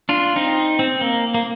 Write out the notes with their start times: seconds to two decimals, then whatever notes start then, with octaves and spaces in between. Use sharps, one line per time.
0.09 D4 F4
0.36 C4 D#4
0.79 C4
1.01 A#3
1.34 A#3